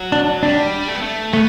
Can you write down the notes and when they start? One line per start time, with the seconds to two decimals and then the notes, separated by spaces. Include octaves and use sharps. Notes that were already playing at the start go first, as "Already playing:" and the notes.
Already playing: F#3
0.12 D4
0.43 G3 D4
0.88 A3
0.95 B3
1.01 A3
1.33 A3 B3